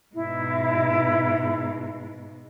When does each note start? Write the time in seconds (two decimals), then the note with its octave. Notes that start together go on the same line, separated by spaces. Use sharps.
0.14 G#2 B2 E4